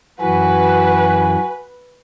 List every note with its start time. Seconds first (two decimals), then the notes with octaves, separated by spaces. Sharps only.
0.21 F#2 E3 F#4 B4 G#5